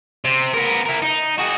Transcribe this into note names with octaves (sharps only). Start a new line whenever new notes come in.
C3
B3 A#4
E4 A#4
D#4
F#4 G#4